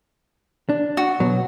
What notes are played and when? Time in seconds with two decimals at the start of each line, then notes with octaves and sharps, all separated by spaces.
0.69 D4
0.97 F#4
1.20 B2 F#3